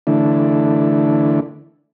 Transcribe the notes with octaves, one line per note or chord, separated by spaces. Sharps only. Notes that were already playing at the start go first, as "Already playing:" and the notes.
D3 E3 A3 D4 E4